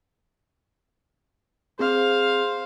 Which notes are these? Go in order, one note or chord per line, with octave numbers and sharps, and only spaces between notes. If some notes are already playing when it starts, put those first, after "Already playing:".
C4 G#4 C5 F5